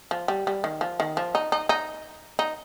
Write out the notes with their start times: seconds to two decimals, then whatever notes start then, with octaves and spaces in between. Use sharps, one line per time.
0.11 F3
0.28 G3
0.47 G3
0.64 D#3
0.81 F3
1.00 D#3
1.17 F3
1.35 D#4
1.52 D#4
1.69 D#4
2.39 D#4